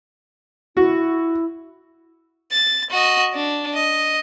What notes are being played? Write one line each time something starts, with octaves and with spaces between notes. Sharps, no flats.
E4 F#4
A6
F#4 D#5
D4
D#5